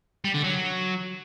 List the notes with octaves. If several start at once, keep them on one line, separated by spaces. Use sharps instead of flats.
G3
D3
F#3